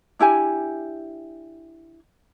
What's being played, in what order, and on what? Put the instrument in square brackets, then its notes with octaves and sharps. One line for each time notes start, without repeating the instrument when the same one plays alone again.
[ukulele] D4 E4 G4 G#5